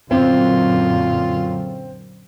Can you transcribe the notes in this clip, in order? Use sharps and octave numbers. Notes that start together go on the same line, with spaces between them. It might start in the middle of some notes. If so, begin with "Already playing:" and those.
F#2 A#2 D3 C4 F4